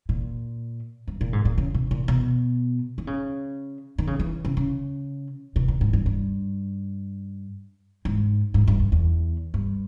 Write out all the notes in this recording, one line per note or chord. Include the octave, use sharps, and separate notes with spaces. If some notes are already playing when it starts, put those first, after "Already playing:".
A#2
G2
A#2
G#2
A#2
C#3
B2
A#2
B2
D#3
C#3
D#3
C#3
E3
C#3
C#3
B2
A#2
G#2
G2
G2
G#2
G#2
G2
E2
E2
G2